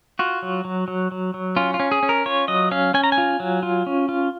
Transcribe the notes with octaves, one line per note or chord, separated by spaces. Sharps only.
F4 F#4
F#3
F#3
F#3
F#3
F#3
C#4 F4
F4
C#4
G#4
C#4
A#4
F4 C#5
F#3 D#5
C#4 F5
C#4 G#5
A#5
G#5
F4
F#3
F4
C#4
F4